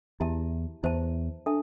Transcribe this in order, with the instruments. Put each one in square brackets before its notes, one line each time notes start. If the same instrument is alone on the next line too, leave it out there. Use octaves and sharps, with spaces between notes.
[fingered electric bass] E2 [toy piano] E4 G4 E5 A5
[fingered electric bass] E2 [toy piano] E4 C5 E5 A5
[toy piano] D4 A4 E5 A5